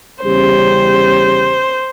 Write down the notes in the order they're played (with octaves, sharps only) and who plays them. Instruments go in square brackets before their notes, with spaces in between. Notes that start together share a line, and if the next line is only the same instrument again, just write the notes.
[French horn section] E2 C#3 G3 C#4 G4 [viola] C5